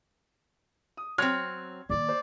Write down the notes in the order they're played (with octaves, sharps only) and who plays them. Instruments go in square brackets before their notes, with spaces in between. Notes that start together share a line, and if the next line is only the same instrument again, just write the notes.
[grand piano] D#6
[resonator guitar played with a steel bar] F#3 C4 [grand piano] C6 F6 G#6
[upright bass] D#3 A#3 [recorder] D5
[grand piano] C5